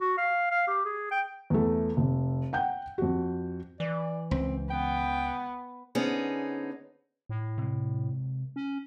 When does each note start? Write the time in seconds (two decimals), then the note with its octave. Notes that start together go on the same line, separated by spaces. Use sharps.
0.01 F#4
0.18 F5
0.51 F5
0.68 G4
0.85 G#4
1.11 G5
1.50 E2 A3
1.97 F1
2.53 F#5 G5 G6
2.98 F2 F#4
3.80 E3 D5
4.31 C#2 C4
4.70 B3 G5
5.95 D3 B3 C#4 D#4 G#4 C5
7.29 A2
7.58 C3 G#3
8.56 C#4